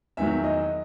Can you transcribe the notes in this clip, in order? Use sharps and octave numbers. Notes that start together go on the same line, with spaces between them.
E2 D#3 F#3 E5
D#5